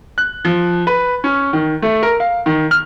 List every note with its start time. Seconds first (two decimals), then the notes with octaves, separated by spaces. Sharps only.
0.18 F#6
0.45 F3
0.87 B4
1.24 C#4
1.53 D#3
1.82 A3
2.03 A#4
2.20 F5
2.46 D#3
2.71 F6